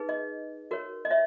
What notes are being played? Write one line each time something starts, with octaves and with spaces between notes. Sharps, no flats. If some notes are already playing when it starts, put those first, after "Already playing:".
Already playing: D#4 G#4 B4
D#5
F#4 A#4 C#5
D#5
C#5 E5